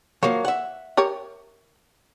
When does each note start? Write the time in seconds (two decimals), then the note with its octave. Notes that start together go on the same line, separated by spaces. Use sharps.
0.23 F3 F#3 A#3 C#5
0.45 E5 F#5
0.97 G4 A#4 C#5